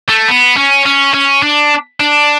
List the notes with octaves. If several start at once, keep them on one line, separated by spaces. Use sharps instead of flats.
A3
B3
C#4
C#4
C#4
D4
D4